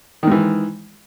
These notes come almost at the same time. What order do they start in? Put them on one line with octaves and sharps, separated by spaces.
D#3 G#2 E3